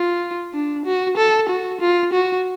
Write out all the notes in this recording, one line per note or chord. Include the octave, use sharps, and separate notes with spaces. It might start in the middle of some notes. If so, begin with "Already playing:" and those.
Already playing: F4
D4
F#4
A4
F#4
F4
F#4